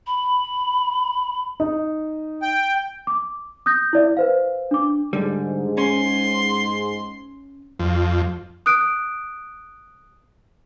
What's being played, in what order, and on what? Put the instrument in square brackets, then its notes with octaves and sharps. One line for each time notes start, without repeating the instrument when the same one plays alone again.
[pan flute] B5
[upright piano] D#4
[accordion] G5
[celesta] D6
D#6 F#6 G6 A#6
E4 D5 E5
B4 C5 F5
D4 D6
[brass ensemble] G#2 [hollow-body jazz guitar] D3 G3
[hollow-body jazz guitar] C#4 [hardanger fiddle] C6
[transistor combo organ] F2
[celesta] D#6 F#6 D7